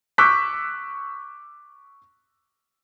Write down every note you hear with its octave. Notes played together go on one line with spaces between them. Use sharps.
C#6 D6 E6 F#6 G6 B6